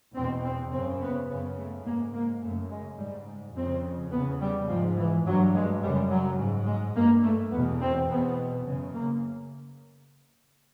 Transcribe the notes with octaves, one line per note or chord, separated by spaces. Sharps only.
E2 B2 C4
C4
F#2 C#3 C4
B3
F#2 C#3 B3
A3
G#2 A#3
A#3
F#2 C#3 A3
G#3
G#2 G3
F2 C#3 C4
E2 C#3 B3
G3
G#2 F3
E3
G2 F#3
G#3
F#2 C#3 G3
F#3
G#2
G#3
G2 A#3
A3
E2 B2 B3
C4
E2 B2 B3
F#2 C#3
A#3